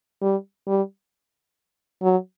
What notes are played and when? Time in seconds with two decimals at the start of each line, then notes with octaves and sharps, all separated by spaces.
0.22 G3
0.67 G3
2.02 F#3